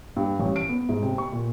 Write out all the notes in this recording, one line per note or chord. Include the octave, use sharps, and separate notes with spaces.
G2
A1
D7
B3
G#2
C3
C#6
A#2